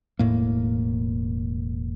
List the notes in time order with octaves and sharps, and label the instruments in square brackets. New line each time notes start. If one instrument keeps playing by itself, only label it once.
[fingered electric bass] E1 A2 A#3